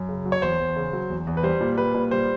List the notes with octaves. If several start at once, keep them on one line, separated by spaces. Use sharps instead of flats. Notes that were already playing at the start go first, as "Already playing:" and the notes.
Already playing: F#2
C#3
F#3
C#5
E2 C5
E2
C#3
F#3
E2
E2
B4
G3 C5
A#2
G3 B4
A#2
G3 C5